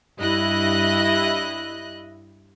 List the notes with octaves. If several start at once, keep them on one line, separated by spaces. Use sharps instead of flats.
G2 E4 D#5 F#6